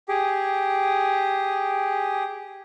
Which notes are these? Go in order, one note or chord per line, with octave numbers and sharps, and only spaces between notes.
G4 G#4